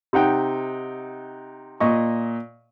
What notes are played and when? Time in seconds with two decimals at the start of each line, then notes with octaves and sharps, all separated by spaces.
0.13 C3 D#4 F#5 G5
1.80 A#2 D#5 C#6